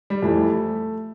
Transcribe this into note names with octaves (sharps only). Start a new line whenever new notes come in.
G3
F2 E3 G3 A3